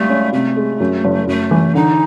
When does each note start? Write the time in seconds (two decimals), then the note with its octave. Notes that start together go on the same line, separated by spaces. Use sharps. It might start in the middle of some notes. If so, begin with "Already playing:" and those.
Already playing: G#1 G3 A3
0.09 C#4
0.33 C3 A3
0.57 G#3
0.80 F#2
1.04 F#1
1.27 F#2 A3
1.51 E3
1.75 D3 D#4